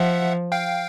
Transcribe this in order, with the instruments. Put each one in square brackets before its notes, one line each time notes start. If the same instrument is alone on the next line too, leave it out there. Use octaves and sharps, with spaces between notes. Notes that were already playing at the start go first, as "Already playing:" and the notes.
Already playing: [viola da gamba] F3 [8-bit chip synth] E5 F#5
[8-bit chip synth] F5 G5